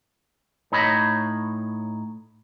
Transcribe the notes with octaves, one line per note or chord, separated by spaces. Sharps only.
A2 D#4 C#5 D#5 B5